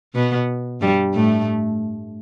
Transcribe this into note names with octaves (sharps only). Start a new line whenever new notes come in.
B2 B3
G2 G3
A2 A3